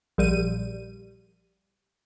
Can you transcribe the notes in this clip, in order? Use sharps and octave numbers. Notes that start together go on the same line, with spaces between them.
A#1 G3 D#7